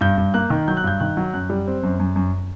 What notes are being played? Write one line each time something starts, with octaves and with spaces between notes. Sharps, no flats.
G2 G6
G2
A#3 F#6
D#3
F#3 G6
F#6
G2 G6
D#3 F#6
F#3
F#2 F#6
G3
C4
F#2
F#2
F#2